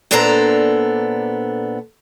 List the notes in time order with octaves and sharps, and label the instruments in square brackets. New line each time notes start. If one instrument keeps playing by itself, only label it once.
[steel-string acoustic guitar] A#2 B3 D4 A4 C5 A#5